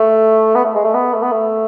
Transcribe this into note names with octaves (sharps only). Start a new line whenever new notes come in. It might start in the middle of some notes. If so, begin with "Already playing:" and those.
Already playing: A3
B3
A3
G#3
A3
B3
A3
B3
A3